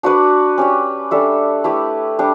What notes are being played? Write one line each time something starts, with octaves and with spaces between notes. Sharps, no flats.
D4 F#4 B4 D5
C#4 G4 D5
G3 D4 A4 E5
A3 E4 G4 B4
G3 D4